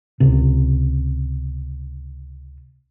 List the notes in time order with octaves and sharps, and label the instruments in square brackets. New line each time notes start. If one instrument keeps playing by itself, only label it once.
[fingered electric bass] C#2 C3